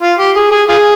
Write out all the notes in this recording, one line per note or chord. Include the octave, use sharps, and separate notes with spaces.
F4
G4
G#4
G#4
F4 G#4